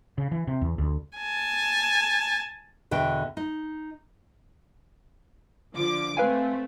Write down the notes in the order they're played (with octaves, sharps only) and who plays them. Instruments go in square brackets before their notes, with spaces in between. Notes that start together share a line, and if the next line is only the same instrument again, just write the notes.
[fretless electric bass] C#3
E3
C3
E2
D2
[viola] G#5 A5
[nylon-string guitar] E2 B2 D3 E5 G5
D#4
[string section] D3 F3 D6
[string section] A3 C4 [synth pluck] B4 F5 G#5